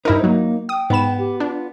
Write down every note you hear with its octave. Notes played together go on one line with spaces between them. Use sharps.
G2 D#4 E4 A#4 C5
F#3 A#3
G5 D#6
G#2 B3 B5 E7
G4
D4 F4